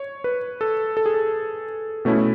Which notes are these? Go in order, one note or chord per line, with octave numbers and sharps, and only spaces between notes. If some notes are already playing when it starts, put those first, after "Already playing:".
Already playing: C#5
B4
A4
A4
G#4
A4
B2 A3 C#4 E4